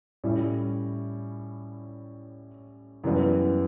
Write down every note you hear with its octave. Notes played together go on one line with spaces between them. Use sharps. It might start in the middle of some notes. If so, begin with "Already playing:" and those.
A2 G3 C#4 E4
F#2 E3 G3 B3